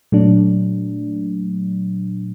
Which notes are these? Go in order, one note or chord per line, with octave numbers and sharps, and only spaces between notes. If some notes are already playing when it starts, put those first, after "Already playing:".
A#2 F#3 A3 D4